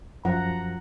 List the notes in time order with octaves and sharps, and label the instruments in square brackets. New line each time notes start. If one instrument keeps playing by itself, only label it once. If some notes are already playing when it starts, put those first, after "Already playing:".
[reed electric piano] F#2 F3 [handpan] F#5 [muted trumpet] A#5